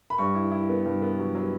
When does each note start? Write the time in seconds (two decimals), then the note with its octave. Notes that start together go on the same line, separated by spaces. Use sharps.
0.10 B5
0.18 G2 C#6
0.35 E4
0.52 E4
0.69 B3
0.85 G2
1.02 B3
1.19 F#3
1.35 F#3